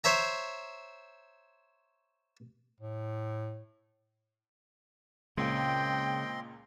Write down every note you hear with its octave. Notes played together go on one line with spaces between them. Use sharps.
C5 C#5 E5 A#5
A2
C#2 A#2 C#3 C4 D#5 G5 C6